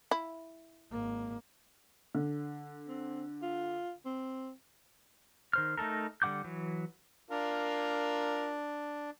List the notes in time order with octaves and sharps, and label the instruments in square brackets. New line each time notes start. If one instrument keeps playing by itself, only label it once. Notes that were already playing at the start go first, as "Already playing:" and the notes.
[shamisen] E4
[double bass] G#1 A#3
[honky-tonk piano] D3
[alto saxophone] C4
F4
C4
[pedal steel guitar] D#3 C5 F6
A3 D#4 A4 A#4
D3 G3 F#5 D6 G6
E3 F#3
[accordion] D4 [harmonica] F4 A#4